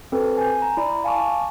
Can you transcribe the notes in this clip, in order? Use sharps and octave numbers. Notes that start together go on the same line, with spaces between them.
C4 F#4 A4 B4
G#5 G6
A#5
E4 D5
F5 G#5 A5 C#6 D6